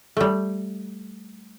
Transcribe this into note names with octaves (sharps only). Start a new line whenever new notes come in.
G3 A3